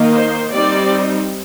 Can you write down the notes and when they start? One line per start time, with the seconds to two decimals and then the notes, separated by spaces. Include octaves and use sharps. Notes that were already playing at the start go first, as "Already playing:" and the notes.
Already playing: D#3 A#3 D#4
0.12 C5
0.53 G3 C4 D#4 D5